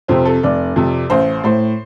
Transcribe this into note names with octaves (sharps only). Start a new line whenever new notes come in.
F2 C3 C4
A4
F1 D5
F2 C3
A1 C5
A2 C5